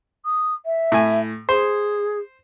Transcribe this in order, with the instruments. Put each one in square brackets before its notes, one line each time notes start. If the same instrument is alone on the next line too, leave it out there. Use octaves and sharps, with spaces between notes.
[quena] D#6
E5
[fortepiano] A2 G#5
[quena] G#4 [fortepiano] C5